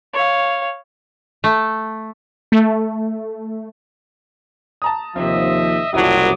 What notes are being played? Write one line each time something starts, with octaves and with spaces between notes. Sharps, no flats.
C#5 F5
A3
A3
A5 A#5 D#6
D#2 C3 F3 C4 D#5 E5
F#1 C2 F3 F#3 E4 D5 D6 D#6